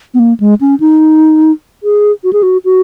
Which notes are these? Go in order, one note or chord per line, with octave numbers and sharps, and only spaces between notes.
B3
A#3
G#3
C#4
D#4
G#4
F#4
G#4
F#4
F#4